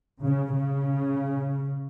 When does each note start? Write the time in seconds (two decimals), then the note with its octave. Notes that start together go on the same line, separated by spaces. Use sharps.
0.24 C#3
0.55 C#3